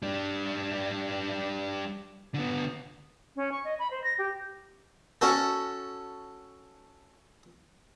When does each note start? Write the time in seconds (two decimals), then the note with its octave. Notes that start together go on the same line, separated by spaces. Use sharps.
0.02 G3 D4
2.34 D3 B3
3.36 C#4
3.52 C#6
3.64 D#5
3.79 B5
3.91 C5
4.04 A#6
4.18 G4
5.21 C#4 F#4 A4